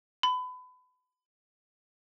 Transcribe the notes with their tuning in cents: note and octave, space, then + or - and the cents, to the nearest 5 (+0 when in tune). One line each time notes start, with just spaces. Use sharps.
B5 +30